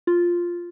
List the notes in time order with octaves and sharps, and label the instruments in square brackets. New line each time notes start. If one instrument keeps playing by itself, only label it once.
[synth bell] F4